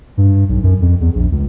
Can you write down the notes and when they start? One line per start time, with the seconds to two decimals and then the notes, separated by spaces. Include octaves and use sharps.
0.17 G2
0.49 B1
0.63 F#2
0.81 F2
1.01 E2
1.15 A#1
1.32 C#2